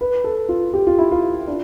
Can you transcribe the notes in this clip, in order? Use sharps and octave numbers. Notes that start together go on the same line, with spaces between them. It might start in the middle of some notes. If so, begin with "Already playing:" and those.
B4
A4
F4
G4
F4
E4
F4
D4